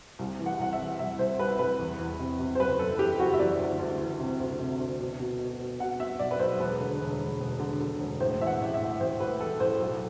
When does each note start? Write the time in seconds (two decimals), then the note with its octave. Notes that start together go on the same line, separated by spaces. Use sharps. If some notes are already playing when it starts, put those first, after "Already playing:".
0.19 C2
0.39 E3
0.46 F#5
0.59 C2 F#5
0.73 E5
0.79 E3
0.99 C2 E5
1.19 C2 C5
1.39 C2 B4
1.59 C2 B4
1.80 E2
1.99 E2
2.19 C3
2.39 C3
2.55 C5
2.59 F#1 B4
2.79 F#1 A4
2.99 E3 G4
3.19 F#1 F#4
3.33 E5
3.39 E3 D5
3.60 D2
3.79 D2
4.00 E3
4.20 C3
4.40 D2
4.60 C3
4.79 D2
5.00 B2
5.20 B2
5.39 B2
5.59 B2
5.79 B2 F#5
6.00 B2 E5
6.19 B1 D5
6.31 B4
6.39 B1 C5
6.60 E1 B4
6.80 D3
7.00 E1
7.20 E1
7.40 E1
7.60 D3
7.80 D3
8.00 E1
8.20 A2 C5
8.41 E3 E5
8.47 F#5
8.60 A1
8.74 E5
8.80 A2
9.00 A1 C5
9.20 A2 B4
9.40 E3 A4
9.60 A1 C5
9.80 B1 A4